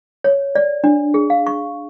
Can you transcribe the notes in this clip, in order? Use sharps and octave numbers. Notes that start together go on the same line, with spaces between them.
C#5
D5
D4
G#4
F5
C#6